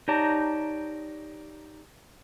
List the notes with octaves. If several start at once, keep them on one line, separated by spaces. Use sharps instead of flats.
D#4 G4 C#5 D5 A5 A#5